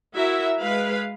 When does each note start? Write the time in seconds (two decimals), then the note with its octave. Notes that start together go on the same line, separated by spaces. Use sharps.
0.15 E4 F#4 A#4 E5
0.61 G#3 B4 F5